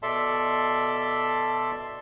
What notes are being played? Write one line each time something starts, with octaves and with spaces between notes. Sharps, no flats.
B2 A4 D5 E5 A5 C6